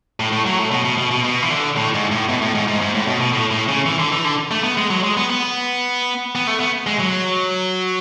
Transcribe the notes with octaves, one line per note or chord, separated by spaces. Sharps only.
A2
A2
F#3
A2
B2
B2
B2
B2
B2
E3
D3
A2
G#2
A2
B2
A2
G#2
G#2
G#2
A2
B2
B2
A2
A2
C#3
E3
D3
E3
D3
A3
B3
G#3
F#3
G#3
B3
B3
B3
A3
B3
G#3
F#3